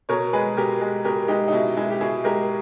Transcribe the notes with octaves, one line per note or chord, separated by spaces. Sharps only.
B2 A#4 C#5
G#3 G#4 B4
B2 G4 A#4
G#3
B2 G4 A#4
G#3 D#4 G4
D#4
B2 E4
G#3 E4
G4
B2 E4 G#4
G#3 G4 A#4